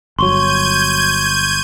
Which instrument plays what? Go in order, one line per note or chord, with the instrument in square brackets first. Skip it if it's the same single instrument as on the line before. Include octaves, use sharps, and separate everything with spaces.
[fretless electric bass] G1 F#3 [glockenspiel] C6 C#6 G7 [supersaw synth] G6 G#6 D#7